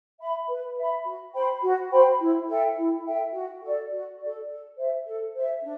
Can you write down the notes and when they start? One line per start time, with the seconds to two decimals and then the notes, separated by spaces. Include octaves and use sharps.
0.20 E5 B5
0.49 B4
0.77 E5 B5
1.05 F#4
1.34 C5 G5 B5
1.63 F#4
1.91 C5 G5 B5
2.20 E4
2.48 A4 E5 G5
2.76 E4
3.06 A4 E5 G5
3.34 F#4
3.63 A4 D5
3.91 F#4
4.20 A4 D5
4.48 A4
4.77 C5 E5
5.06 A4
5.34 C5 E5
5.63 D4